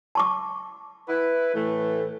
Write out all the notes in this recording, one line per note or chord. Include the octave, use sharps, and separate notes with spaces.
A5 C#6 D6
E4 B4
A2 E3 A3